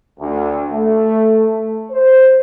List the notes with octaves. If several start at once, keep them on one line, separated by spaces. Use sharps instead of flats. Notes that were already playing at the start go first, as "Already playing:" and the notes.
D2
A3
C5